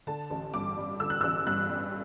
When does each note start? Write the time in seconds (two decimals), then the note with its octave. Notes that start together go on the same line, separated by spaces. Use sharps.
0.07 D3 A5
0.30 A1
0.54 G2 D6
0.77 G3
1.00 D3 E6
1.10 F#6
1.21 A1 E6
1.47 G2 F#6
1.69 G3